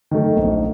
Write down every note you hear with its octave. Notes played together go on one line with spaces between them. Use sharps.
D#3 F#3 A3
A#1